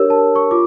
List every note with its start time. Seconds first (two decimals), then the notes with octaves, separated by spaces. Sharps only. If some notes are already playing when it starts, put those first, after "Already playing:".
Already playing: D4 G4 A#4 C#5 E6
0.10 A5
0.35 C#6
0.51 F4 D6